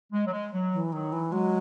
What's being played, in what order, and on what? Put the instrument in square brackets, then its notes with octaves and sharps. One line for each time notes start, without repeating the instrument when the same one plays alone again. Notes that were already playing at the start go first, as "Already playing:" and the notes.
[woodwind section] G#3
F#3
G#3
F#3
[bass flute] E3
[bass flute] D#3 [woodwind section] F#3
[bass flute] E3
[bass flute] F#3 [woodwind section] G#3